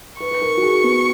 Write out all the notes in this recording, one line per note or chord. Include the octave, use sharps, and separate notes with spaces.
B4 C#6
B4
A#4
F#4
G#4
B3